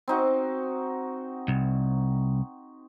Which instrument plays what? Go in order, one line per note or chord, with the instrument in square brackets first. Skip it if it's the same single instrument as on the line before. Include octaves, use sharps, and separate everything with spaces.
[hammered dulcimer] C4 D#4 F#4
[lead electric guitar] C2